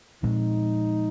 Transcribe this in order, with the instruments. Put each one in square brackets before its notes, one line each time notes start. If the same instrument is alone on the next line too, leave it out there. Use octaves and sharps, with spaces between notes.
[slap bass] A#2 F3 G#3 C4 [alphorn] D#4